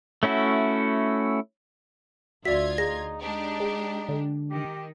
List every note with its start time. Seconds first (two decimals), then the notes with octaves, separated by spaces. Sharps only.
0.23 A3 C#4 E4 F#4
2.45 D2 F4 F#4 D5 E5 G#6 B6
2.78 D#4 G#4 A#6
3.22 G#3 D4 D#4 G4
3.60 G#4
4.09 D3
4.51 D#3 G4